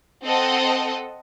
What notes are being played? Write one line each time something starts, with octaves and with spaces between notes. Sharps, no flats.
C4 A4 D#5 F#5